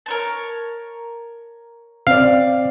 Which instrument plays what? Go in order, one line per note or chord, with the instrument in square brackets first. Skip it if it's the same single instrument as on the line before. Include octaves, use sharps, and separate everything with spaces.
[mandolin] A#4 C#5 A5
[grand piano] C4 D5 [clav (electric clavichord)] F5